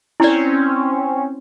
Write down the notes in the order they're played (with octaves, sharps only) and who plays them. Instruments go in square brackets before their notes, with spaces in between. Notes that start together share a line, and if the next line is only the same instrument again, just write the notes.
[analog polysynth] C4 C#4 [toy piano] E4 D5